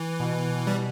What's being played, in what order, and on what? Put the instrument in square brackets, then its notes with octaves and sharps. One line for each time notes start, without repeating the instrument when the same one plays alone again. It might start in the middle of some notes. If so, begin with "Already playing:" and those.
Already playing: [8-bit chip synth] E3
[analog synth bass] B2
[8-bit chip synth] G3